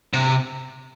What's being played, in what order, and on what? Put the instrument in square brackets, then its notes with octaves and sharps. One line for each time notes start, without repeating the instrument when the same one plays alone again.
[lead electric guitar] C3